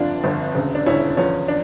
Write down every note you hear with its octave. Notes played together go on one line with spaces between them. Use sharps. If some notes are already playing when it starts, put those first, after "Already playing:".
Already playing: G1 F2 D3 D4 F4
G1 F2 D3
E1 D2 C#3
D4
E1 D2 C#3 C#4 E4
E2 D3 F3 C#4
D4